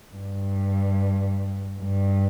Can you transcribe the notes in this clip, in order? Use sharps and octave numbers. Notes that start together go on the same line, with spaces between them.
G2
G2